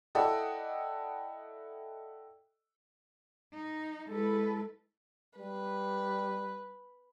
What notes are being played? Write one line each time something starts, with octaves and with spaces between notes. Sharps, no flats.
E4 A4 D5 D#5 F#5 G5
D#4
G#3 E4 A4 B4
G3 B4